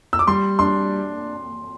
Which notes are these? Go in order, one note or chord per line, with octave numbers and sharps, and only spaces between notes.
E6
D6
G3 C6
D4 C6